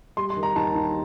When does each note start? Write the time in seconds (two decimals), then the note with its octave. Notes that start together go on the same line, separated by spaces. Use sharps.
0.17 G3 C6
0.30 C6
0.37 D#3
0.43 A#5
0.56 D#2 A5
0.75 D#2